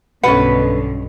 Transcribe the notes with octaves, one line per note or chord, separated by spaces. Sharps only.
B1 G2 B2 D3 C#4 A4 B4 F#5